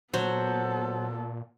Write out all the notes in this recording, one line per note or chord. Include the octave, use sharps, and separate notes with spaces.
A#2 F#3 B3 A4 C5